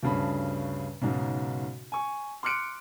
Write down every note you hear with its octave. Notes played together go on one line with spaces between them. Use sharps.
D2 G2 C#3 A5 B5
B1 G#2 C#3
G#5 C#6
C6 D6 F6 F#6 C#7 D7